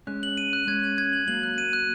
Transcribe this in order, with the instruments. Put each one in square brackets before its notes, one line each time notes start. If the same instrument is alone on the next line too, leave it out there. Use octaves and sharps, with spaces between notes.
[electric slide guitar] G#3 C#4 [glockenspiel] F#6
[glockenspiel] F#7
D#7
F#6
[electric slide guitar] G#3 C#4 [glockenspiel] G#6
[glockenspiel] F#7
G#6
F#7
[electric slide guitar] F#3 A#3 [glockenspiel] F#7
[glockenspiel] F#6
D#7
F#6